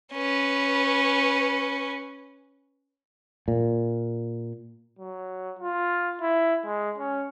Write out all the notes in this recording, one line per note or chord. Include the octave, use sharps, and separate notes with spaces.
C#4 B4
A#2
F#3
F4
E4
G#3
C#4